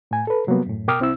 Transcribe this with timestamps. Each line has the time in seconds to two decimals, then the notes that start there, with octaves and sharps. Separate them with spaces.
0.11 A2 G#5
0.27 A4 B4
0.47 C3 F#3 G3 A#3 B3
0.66 F#2 A2
0.88 B2 A#4 G5 D6 D#6 F6
1.00 C2 C4 E4 E6